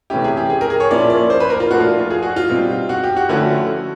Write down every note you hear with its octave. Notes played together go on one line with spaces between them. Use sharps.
C3 E3 A3 C#4 E4 G4
G#4
G4
G#4
A#4
G#4
C#5
A#2 F3 A#3 C#4 E4 D5
D5
C5
B4
A#4
F4
A#2 F3 A3 D4 F#4
F4
F4
G#4
F#4
F4
B2 G3 C4 D#4
F#4
G4
F#4
D3 F3 A3 C#4 E4 F#4